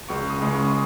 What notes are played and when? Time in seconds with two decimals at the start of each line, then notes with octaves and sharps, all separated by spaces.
0.09 C#2 C#6
0.30 D#6
0.40 C#3 G#3
0.51 C#6
0.65 D#6